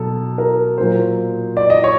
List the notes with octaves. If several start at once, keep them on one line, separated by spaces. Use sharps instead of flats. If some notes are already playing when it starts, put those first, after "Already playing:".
Already playing: B2 F#3 A4
A#4
A#2 F#3 A#3 C5
D5
D#5
C#5